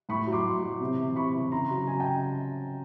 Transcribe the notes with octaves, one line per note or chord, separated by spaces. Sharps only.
A2 B5 C#6
F#3
C6 D6
A2
F#3
C3
E3
C3 B5 C#6
E3
C#3 A#5 C6
F#3
C#3 G#5 A#5
G5 A5